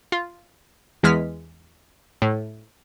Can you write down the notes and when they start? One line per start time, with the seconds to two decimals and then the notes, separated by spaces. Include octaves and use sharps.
0.12 F4
1.03 E2 E3 G#3 F6 B6
2.22 A2